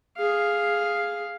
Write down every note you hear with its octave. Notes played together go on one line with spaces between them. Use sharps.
G#4 F5